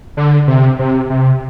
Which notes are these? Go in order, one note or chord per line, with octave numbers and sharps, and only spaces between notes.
D3
C3
C3
C3